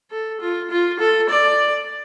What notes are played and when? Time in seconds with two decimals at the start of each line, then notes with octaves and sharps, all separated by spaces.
0.11 A4
0.41 F4
0.71 F4
1.00 A4
1.29 D5